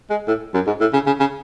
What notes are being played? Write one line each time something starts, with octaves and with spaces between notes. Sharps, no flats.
G#3
A2
F#2
G#2
A2
C#3
C#3
C#3